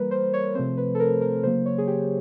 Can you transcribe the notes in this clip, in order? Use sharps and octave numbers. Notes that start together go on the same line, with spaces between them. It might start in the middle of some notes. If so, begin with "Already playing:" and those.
Already playing: E3 G3 A#3 A#4 B4
C5
C#5
C3 F3 A3 C4 C5
B4
A4
A#4
A#4
C#3 F#3 A#3 C5
C#5
G#4
G4